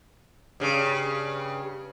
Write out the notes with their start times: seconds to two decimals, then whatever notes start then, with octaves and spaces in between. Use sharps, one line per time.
0.60 G2 C#3